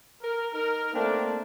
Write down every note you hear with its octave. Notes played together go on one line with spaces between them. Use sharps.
A#4
D#4 A#4
A3 A#3 C4 D4